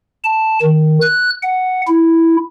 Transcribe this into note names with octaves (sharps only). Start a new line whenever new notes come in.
A5
D#3
F#6
F#5
E4